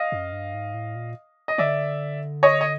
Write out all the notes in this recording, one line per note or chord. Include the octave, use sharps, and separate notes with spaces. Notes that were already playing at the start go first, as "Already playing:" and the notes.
Already playing: D#5 F5
F#2
G2
G#2
A2
A#2
D#5
D3 D5 E5
C#5 D#5
D#5